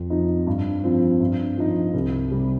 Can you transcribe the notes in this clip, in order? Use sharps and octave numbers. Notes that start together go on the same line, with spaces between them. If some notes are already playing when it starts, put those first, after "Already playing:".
Already playing: F2
F3 D#4
G2
F3 C4 F4
G2
F3 D#4
C2
C3 G3